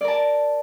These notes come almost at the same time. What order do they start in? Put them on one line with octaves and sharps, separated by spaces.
D5 A#4 A5